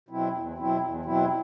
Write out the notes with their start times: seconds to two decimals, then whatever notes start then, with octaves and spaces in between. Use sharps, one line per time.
0.08 B2 F#3 C4 E4
0.33 E2
0.58 B2 F#3 C4 E4
0.81 E2
1.05 B2 F#3 C4 E4